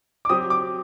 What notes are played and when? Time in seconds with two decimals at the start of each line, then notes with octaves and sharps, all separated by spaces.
0.25 D6
0.29 F#3 C4 G4 D#6
0.50 D6